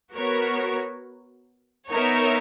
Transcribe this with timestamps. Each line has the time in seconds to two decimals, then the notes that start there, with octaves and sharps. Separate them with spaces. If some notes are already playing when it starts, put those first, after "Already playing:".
0.15 B3 F#4 A#4 C#5
1.90 B3 D#4 A#4 C#5 E5